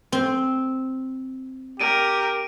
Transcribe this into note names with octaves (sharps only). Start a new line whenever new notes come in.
C4
G4 A#4 D7 D#7